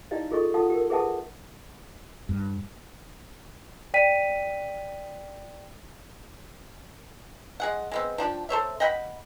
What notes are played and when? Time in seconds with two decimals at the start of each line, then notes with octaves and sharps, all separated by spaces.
0.11 D#4 E4 G4 D5 D#5 F5
0.31 F4 G#4 A4 D#5 C#6
0.54 F4 A4 F5 F#5 A5 D#6
0.70 G4 A#4
0.90 G#4 B4 E5 F#5 A5 D#6
2.29 G2
3.94 D5 G5 B6 D#7
7.60 G#3 G#4 F#5
7.91 G#3 B3 C4
8.18 F3 D4 G4
8.49 A4 C5 C#5 E5
8.80 D#5 F#5 G5 B5